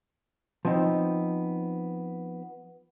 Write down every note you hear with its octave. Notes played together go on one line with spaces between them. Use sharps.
F3 B3 C4 D#4